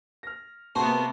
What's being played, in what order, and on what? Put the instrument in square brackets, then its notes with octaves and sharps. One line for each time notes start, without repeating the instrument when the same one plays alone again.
[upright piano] F6 A#6
[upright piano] C3 [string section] A#3 B3 [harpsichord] F#4 G#4 C5 [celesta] A5 C#6